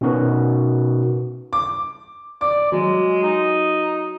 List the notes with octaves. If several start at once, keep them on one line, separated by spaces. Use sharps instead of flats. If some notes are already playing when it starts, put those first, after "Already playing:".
B2 C#4 D#4 F#4 A#4 B4
D6
D5 D6
F#3 G#3
D#4